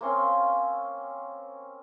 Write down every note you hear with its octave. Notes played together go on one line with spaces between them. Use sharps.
A#3 C4 C#4 C6